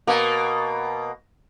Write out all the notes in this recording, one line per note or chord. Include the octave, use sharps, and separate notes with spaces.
B2 A#3